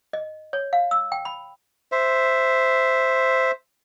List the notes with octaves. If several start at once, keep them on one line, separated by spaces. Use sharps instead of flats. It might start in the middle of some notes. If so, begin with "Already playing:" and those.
D#5
C#5
F5
E6
G5
B5
C5 E5